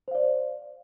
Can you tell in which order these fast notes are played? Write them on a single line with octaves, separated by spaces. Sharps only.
C5 F5 D5